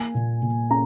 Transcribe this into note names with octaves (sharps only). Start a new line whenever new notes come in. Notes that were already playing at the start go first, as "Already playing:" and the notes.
Already playing: A#3 G#5
A#2
A#2
C#4 A#5